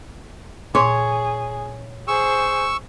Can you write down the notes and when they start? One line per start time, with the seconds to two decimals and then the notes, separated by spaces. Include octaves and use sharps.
0.75 A#2 G#4 C#5 C6
2.08 G#4 C5 C#6 E6